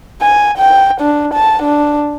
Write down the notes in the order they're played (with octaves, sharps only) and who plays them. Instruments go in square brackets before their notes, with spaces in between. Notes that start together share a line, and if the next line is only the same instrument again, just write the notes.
[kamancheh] G#5
G5
D4
A5
D4